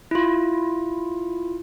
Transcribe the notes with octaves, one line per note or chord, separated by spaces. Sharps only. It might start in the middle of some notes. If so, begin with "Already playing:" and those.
E4 F4